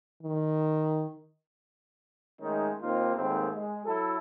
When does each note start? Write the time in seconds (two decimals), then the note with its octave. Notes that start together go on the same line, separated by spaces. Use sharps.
0.23 D#3
2.41 D#3 G#3 A3 C#4 D#4
2.82 D#2 A#3 C4 D#4 F4
3.16 D#2 G#2 D#3 A3 C4
3.55 G#3
3.86 F#3 E4 A4